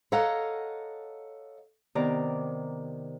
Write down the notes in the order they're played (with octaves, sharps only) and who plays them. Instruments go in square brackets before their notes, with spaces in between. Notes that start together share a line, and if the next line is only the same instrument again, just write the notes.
[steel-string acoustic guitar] A4 C#5 D#5 F5 F#5 A#5
[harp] C3 D#3 B3 D5 A#5 D6